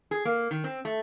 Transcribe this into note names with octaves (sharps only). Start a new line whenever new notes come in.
G#4
A#3
D#3
C4
A3